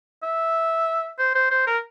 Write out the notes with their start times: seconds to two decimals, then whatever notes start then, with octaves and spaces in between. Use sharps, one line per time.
0.23 E5
1.18 C5
1.35 C5
1.51 C5
1.67 A#4